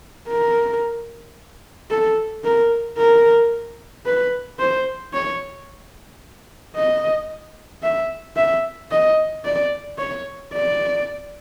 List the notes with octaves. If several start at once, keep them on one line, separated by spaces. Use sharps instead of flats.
A#4
A4
A#4
A#4
B4
C5
C#5
D#5
E5
E5
D#5
D5
C#5
D5